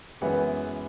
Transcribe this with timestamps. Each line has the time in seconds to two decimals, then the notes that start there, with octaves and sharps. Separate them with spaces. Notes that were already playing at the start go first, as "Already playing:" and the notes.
0.21 F#2 E3 G#3 B3 F#5